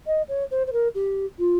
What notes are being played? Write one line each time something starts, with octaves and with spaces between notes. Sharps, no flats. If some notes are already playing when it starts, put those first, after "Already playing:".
D#5
C#5
C5
C5
A#4
G4
F4